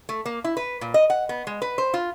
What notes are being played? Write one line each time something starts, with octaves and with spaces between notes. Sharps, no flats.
A3
A#3
E4
B4
A#2
D#5
F#5
B3
G#3
B4
C5
F4